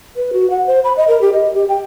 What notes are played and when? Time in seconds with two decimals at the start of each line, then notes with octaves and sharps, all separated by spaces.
0.16 B4
0.33 F#4
0.50 F#5
0.66 C5
0.84 B5
0.97 D#5
1.08 A#4
1.21 G4
1.33 D#5
1.54 G4
1.69 G5